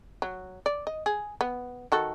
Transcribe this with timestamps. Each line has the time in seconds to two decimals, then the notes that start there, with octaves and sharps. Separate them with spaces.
0.22 F#3
0.66 D5
0.87 D#5
1.06 G#4
1.41 B3
1.92 D#3 F#4 A4